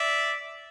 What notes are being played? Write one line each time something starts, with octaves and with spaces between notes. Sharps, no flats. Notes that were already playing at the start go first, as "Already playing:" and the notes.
Already playing: D5 E5